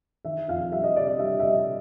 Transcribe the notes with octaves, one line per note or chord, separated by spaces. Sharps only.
D#3 E5
F2 F5
G3 E5
D#5
C3 D5
D#5
G3 E5
E5
G3 D#5